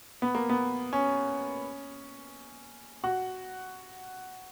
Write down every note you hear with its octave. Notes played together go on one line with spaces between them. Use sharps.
B3
A#3
B3
C#4
F#4